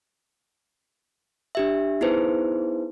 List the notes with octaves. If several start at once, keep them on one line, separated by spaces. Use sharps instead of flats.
D4 G4 E5
B3 D#4 E4 G#4 B4 C5